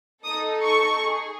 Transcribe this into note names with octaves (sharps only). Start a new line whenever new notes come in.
D#4 A4 D#6
C#6
G#4